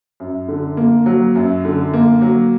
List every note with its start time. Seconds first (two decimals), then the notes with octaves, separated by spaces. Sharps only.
0.20 F#2
0.48 D3
0.77 A#3
1.06 F#3
1.36 F#2
1.65 D3
1.94 A#3
2.22 F#3